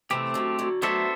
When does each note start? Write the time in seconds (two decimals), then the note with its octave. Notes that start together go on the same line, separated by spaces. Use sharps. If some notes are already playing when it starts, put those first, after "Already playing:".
0.10 C3 E3 A3 C4 G4
0.34 D3 F#3
0.59 D3 F#3
0.82 F#3 A3 B3 D4 A4 C5 E5